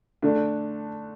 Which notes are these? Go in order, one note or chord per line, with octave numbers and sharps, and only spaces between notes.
D3 A3 D4